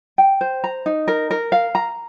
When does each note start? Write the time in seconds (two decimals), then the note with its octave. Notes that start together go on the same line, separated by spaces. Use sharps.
0.18 G5
0.41 C5
0.64 A#5
0.86 D#4
1.08 A#4
1.31 A#4
1.52 F5
1.75 A#5